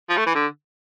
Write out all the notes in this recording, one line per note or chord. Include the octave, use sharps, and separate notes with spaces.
F3
A3
E3
D3